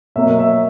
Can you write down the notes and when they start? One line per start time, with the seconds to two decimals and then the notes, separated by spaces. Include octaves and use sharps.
0.16 B2 F#3 A#3 C#5 E5
0.38 C#5 E5